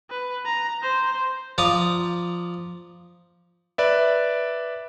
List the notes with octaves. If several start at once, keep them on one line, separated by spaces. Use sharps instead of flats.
B4
A#5
C5
F3 D5 A#5 D6 D#6
B4 D5 E5